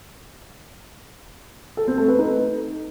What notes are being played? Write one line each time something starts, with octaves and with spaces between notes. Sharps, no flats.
A4
C4
A3
B4
D#4